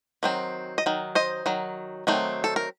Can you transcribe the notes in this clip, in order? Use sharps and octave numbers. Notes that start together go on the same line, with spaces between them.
D#3 F#3 C4
D#5
D#3 F#3
C5 D#5
D#3 F#3
D#3 F#3 A3 C4
A4
A#4